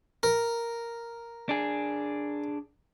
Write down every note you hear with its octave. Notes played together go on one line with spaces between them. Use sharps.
A#4
D4 G#4